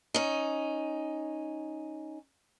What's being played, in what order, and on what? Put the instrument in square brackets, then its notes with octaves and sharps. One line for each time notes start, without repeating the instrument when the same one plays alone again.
[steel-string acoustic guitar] C#4 D#4